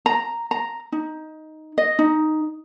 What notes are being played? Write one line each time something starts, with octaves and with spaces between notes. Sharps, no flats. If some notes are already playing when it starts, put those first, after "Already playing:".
A#5
A#5
D#4
D#5
D#4